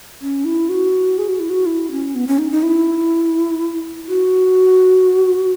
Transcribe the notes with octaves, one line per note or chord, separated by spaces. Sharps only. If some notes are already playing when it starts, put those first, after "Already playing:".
C#4
E4
F#4
G#4
F#4
E4
F#4
E4
C#4
B3
C#4
D#4
D#4
E4
F#4